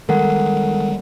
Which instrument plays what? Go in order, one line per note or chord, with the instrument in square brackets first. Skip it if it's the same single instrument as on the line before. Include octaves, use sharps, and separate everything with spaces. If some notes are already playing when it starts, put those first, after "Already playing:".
[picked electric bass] D#3 G3 G#3 [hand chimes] A4 A#4 F#5